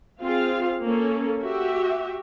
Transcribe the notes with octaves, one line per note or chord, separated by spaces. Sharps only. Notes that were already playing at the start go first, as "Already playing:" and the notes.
C4 F4 G#4 F5
A#3 C#4 A4
F#4 G4 E5